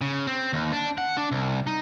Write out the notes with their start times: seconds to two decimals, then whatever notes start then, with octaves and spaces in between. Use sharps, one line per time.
0.01 C#3
0.27 C4
0.53 D#2
0.73 D4
0.98 F#5
1.17 D4
1.32 C2
1.67 D#4